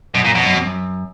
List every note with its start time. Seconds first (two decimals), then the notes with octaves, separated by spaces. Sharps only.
0.15 F#2 B2
0.25 F#2 A#2
0.35 F2 B2
0.46 F#2
0.56 F2
0.66 F#2